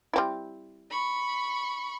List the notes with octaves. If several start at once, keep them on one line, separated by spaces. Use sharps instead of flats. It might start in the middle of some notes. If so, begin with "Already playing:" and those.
G3 C4 E4
B5 C#6